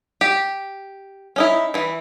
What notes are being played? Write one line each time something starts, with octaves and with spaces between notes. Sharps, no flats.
G4
C#4 D#4 E4
E3 E4